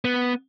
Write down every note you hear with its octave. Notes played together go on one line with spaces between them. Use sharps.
B3